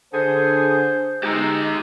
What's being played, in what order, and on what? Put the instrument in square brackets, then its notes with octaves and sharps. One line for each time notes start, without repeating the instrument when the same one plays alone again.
[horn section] D3 G#4 [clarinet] C5
[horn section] G#3 D#4 [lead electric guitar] G4 A#5